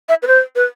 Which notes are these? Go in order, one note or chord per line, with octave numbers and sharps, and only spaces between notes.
E5
B4
C5
B4